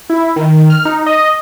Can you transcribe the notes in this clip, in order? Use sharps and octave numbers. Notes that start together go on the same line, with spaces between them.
E4
D#3
F6
D#4
D#5